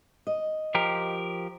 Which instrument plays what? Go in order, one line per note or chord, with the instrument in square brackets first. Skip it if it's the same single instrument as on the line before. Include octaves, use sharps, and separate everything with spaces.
[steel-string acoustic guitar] D#5
[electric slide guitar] F3 G4 A#4